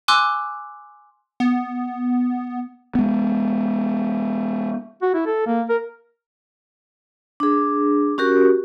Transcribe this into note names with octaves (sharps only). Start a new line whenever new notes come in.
G#5 C6 D6 E6 F#6
B3
G#3 B3
F#4
E4
A4
A#3
A#4
D4 G#4
C#4 F#4 G4 A#4